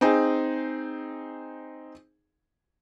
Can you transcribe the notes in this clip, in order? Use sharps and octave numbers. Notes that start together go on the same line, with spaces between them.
C4 D#4 G#4